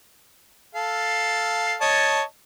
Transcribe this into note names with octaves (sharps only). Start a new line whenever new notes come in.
A4 F5
C#5 D#5 A5